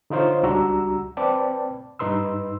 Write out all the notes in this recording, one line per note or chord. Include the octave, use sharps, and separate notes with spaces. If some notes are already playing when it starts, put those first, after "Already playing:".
D3 D#4 F4 C5 C#5
C#2 G3 D4 F#4 A#5 E6
C4 B4 D5 G5 A5
G2 D#4 B4 C6 E6